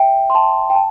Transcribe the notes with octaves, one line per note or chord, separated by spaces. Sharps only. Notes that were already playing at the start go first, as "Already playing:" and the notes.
Already playing: E5 G5
C6
A5
G5
A5